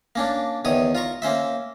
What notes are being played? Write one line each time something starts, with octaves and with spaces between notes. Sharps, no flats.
A#3 C#4 D4
E2 D#3 C#5 D#6
F4 A#5 C#6
A#3 C#4 C5 E5